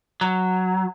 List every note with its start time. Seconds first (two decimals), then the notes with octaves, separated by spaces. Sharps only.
0.21 F#3